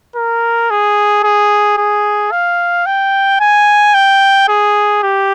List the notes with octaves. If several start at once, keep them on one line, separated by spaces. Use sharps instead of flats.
A#4
G#4
G#4
G#4
F5
G5
G#5
G5
G#4
G4